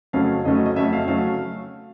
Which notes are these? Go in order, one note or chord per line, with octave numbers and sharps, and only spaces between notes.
F2 C#3 F#3 A3 C#4 F5
F2 C#3 F#3 A3 C#4 D#5
D#5
D#5
F2 C#3 F#3 A3 C#4 E5
F5
C#3 F#3 A3 C#4 F5